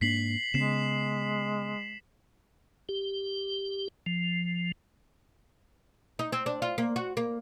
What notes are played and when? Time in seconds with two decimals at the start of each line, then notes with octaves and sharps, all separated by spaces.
0.01 G#2 A#3 D4 B6 C7 F#7
0.54 C#3 G#3 B3 C#4 C7 E7
2.89 G4
4.06 F3
6.19 D#4
6.32 C4
6.46 D4
6.62 F4
6.78 A#3
6.96 F#4
7.17 A#3